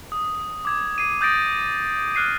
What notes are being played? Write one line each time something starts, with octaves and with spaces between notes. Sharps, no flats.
D#6
D6 G#6
C7 D#7
D#6 G6 A6 A#6 D7
F6 F#6 C7 D#7